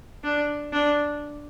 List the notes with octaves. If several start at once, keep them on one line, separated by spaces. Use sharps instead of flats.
D4
D4